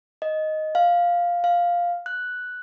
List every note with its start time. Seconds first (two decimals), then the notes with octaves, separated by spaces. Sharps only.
0.22 D#5
0.75 F5
1.44 F5
2.06 F#6